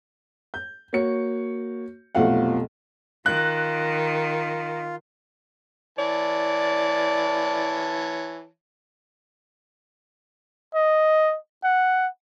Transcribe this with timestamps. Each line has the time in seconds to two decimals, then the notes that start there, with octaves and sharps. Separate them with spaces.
0.54 G6
0.93 A#3 F#4 C#5 C#7
2.15 F1 B1 F3 A3 F5 F#5
3.26 D#3 F4 F#6
5.99 E3 C#5 D5 A5
10.75 D#5
11.64 F#5